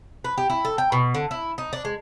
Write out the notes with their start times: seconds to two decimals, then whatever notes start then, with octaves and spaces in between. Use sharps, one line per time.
0.24 B4
0.38 G4
0.50 E4
0.65 A4
0.78 G5
0.92 B2
1.14 D3
1.31 E4
1.58 D#4
1.73 D4
1.85 G#3